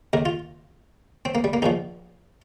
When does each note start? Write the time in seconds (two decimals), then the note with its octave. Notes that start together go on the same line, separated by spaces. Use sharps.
0.13 D#2 D#3 A#4
0.25 F4
1.25 C4
1.35 A#3
1.44 G3
1.53 A#3
1.62 A#1 A#2 F3 D#4